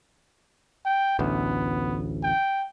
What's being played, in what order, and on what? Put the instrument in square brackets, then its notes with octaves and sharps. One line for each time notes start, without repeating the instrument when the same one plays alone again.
[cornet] G5
[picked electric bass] A1 D2 [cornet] B3
[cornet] G5